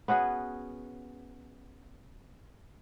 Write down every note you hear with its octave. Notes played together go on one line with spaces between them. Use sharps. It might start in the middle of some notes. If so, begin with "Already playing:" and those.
B3 C#4 F#4 G#4